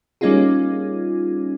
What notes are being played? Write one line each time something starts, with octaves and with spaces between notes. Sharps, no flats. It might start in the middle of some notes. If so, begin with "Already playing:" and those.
G3 A#3 C#4 D#4 F4 G#4